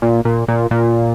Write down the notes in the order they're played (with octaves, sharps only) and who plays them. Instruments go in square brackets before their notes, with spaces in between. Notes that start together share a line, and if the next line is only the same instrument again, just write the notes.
[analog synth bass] A#2
A#2
A#2
A#2